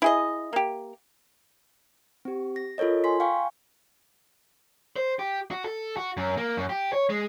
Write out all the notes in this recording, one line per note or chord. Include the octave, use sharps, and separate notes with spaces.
E4 G#4 D#5
A#3 G4
C4 G4
A#6
F4 A4 A#4 C#5 D#5
G#5 C6 B6
F5 G5 G#5 C#6
C5
G4
F#4
A4
F#4
F#2
A#3
F#2
G4
C#5
G#3